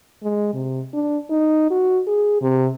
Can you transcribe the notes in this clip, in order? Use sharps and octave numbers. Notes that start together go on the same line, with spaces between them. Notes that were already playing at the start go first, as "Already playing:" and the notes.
G#3
C3
D4
D#4
F#4
G#4
C3